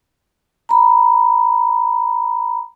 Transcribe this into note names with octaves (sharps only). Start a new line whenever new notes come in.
A#5 B5